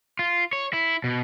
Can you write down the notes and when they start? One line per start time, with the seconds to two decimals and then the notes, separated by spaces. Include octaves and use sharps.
0.19 F4
0.53 C#5
0.73 E4
1.04 B2